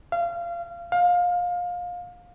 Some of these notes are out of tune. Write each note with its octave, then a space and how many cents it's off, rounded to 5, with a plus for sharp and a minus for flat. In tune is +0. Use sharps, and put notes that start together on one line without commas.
F5 -25
F5 +25